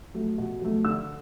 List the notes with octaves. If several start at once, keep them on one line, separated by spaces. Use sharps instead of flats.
F#3 A3
B2
F#3 A3
D3 E6